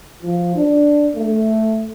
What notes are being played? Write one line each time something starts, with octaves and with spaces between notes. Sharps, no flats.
F3
D4
A3